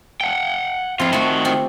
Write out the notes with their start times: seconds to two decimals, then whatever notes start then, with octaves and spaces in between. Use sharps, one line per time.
0.21 F#5 G5
0.99 F2 C4 E4 F4
1.13 D#3 A3 F4 F#4
1.45 C4 F4 G4